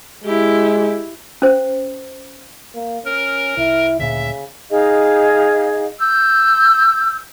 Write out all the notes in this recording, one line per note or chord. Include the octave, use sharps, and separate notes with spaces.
G#3 E4 G4
C#4 C5
A#3
C#4 A#4
C2 E4
D2 A#2 C#3 E5
D#4 G#4 D#5 F5
E6 G6